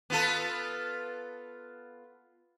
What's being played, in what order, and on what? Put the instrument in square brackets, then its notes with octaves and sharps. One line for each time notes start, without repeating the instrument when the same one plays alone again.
[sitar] B3 F4 A4